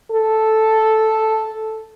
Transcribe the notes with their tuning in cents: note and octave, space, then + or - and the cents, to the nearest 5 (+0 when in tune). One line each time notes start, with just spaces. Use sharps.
A4 -5